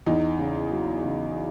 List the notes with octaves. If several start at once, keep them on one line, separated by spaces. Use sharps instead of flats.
E2 D#4
C#3
F#3
C#3